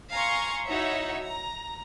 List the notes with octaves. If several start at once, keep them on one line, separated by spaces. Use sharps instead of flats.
F5 G#5 A#5 C6 C#6
D#4 E4 F#4 C#5 E5
A#5